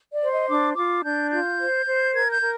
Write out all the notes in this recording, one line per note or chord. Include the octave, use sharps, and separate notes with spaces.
D5
C5
D#5
D4 D6
F4 D6
D4 G6
F4 G6
C5
C5
A#4 G#6
G6
A#4